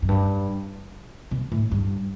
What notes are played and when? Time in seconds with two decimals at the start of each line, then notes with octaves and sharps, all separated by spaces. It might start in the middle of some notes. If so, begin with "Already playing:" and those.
0.02 F#2
0.09 G2
1.31 B2
1.52 A2
1.71 G2